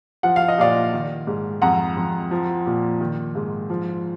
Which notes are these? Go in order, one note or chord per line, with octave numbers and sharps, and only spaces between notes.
F3 F#5
F5
D#5
A#2 D5 F5
D#3
G#2
F2 F#5 A#5
F2
F3
A#2
D#3
G#2
F3